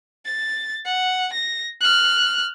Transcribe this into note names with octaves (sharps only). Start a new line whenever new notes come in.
A6
F#5
A#6
F6 F#6